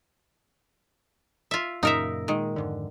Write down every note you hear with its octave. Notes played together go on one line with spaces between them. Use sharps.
F4 E5
F#2 A#2 C#3 D#4 A#4 E5
A#2 D#3 G#3
F2 G#2 D3